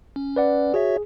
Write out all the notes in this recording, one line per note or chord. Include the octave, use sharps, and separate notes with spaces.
C#4
B4 D5 F#5
F#4 G#4 C#5 E5